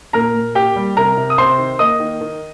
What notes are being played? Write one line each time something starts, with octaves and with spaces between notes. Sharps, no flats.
A#2 A#4 A#5
A#2
A#3 G4 G5
G3
C3 A#4 A#5
C3
D#6
C3 C5 C6
D#3
A#3 D#5 D#6
D#3
D#3